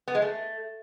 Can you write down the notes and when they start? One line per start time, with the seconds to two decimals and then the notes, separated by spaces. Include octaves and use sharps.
0.08 B3
0.15 G#3
0.22 A3